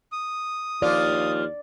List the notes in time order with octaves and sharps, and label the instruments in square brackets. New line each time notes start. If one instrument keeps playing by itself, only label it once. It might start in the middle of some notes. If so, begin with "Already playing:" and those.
[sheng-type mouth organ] D#6
[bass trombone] D#2 [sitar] F3 F4 [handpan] D5